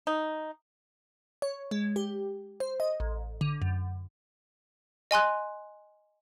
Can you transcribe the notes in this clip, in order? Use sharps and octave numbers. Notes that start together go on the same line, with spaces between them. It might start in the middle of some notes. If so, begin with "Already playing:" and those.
D#4
C#5
G#3
G4
C5
D#5
A1
D3
F#2
D#5 G#5 C6 F#6